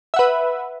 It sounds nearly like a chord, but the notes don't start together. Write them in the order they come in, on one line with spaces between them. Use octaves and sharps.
E5 F#5 B4